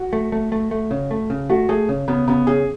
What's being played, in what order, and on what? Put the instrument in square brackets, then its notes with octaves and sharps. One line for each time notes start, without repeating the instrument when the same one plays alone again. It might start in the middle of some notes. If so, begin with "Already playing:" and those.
Already playing: [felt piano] F#4
[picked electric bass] A3
A3
A3
A3
C#3
A3
C#3
[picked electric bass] A3 [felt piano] F#4
[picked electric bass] A3 [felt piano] G#4
[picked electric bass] C#3
[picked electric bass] C#3 [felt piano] B3
[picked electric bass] C#3 [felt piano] B3
[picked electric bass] C#3 [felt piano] G#4